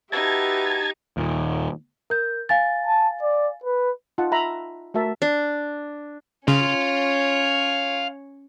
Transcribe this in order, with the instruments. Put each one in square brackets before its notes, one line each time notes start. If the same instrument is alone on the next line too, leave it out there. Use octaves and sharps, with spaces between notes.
[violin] D#4 [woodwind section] F#4 B4 E5 [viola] G4 [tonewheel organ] A5 G#6
[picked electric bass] D#2 A#2
[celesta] A#4 G6
F5 G#5 A6
[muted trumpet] A5
D5
B4
[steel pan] D#4 F4 D#5 F#5 A5
E5 A#5 B5
A3 F#4 A#4 E5 A5
[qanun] D4
[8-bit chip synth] C#3 [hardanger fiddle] C#4 C#5 [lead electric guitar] F5 C6